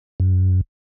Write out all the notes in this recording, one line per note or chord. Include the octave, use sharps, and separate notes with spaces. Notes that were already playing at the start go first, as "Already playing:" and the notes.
F#2